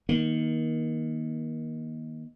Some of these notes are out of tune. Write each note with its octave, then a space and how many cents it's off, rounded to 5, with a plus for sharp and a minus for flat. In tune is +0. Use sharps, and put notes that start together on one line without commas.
D#3 +15 A#3 +25